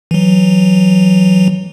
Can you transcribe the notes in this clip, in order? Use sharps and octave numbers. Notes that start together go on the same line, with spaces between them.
E3 F#3